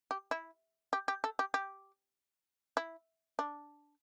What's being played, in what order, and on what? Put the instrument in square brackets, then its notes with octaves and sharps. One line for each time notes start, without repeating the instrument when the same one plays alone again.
[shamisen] G4
E4
G4
G4
A4
G4
G4
E4
D4